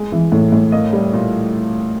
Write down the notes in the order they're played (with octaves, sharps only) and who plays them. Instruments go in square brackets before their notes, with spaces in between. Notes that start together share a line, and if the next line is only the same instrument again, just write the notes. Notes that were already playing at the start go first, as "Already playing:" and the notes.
Already playing: [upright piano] G#3
E3
A2
A2
A#3 D#5
G3
A#2